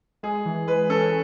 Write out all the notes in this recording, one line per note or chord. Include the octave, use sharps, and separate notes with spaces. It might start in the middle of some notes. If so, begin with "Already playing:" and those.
G#3 G#4
E3
G#3 B4
C#4 A4